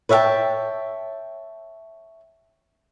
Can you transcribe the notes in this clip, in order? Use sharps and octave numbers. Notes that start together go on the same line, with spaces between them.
B4 C#5 E5 F5 G5 A5